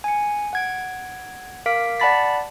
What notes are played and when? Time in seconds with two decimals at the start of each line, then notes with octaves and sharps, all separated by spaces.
0.04 G#5 C#7
0.53 F#5 G#6 D7
1.66 A#4 F5 D6 B6 D7
2.00 D5 F#5 A5 B5 A6 B6